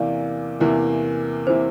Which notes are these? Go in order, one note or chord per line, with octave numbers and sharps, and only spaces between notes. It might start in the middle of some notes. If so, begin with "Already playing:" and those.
Already playing: E2 C3 E3 A#3 E4 D5 F5
E2 C3 E3 A#3 E4
C3 E3 A#3 E4 C5